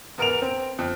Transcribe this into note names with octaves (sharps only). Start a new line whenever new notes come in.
E2 B3 A#4 D7 F7
C4
F2